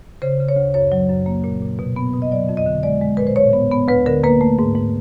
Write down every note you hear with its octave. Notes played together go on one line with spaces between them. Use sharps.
C#3 C5
C#3
C#5
D2
F#2 C#5
F#3
F#2
A#3
A#2
A#2
B2
B3
B2
D#5
F#3 D5
F2
D#5
D3
G#3 D5
G#3
A#2 B4
C5
A2 C#5
B3
B3
D2 B4
D3 A#4
A#3 B4
A3
G#2
G#2